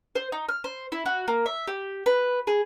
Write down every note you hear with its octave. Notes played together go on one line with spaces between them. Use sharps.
C5
D#4
F6
C5
E4
F#4
A#3
E5
G4
B4
G#4